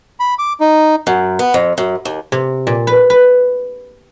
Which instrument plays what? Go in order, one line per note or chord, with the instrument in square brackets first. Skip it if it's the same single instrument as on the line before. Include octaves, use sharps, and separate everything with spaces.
[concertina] B5
D6
D#4
[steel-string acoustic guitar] F#2
B3
F2
F#2
D#2
[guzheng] C3
A#2
B4
B4